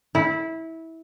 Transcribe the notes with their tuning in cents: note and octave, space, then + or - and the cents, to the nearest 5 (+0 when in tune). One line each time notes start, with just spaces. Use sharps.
E4 -20